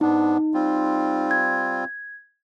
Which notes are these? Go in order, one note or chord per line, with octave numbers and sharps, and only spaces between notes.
G#2 B3 D4 D#4
G3 C4 F4
G#6